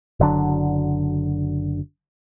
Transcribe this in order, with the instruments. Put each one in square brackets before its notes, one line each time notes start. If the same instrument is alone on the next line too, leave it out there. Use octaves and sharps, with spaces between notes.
[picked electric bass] F#1 D3 F#3 D4